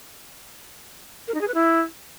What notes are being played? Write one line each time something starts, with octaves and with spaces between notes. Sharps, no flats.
A#4
D#4
G#4
B4
E4